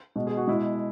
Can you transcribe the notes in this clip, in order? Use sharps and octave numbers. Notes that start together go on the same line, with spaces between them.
B2 G#3
G#4
F#4
B2 G#3 E4